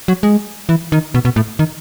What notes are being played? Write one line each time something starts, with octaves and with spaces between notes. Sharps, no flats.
F#3
G#3
E3
D#3
B2
B2
A2
D#3